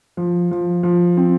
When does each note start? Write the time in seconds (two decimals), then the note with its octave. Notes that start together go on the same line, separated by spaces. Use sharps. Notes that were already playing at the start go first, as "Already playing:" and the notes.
0.17 F3
0.51 F3
0.83 F3
1.17 C4